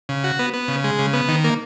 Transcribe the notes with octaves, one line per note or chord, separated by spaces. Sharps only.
C#3
F#4
B3
B3
C#3
G#3
C#3
B3
D#3
A#3